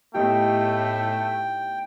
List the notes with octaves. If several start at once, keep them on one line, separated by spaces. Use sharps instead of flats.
A2 A3 B3 D#4 G4 G5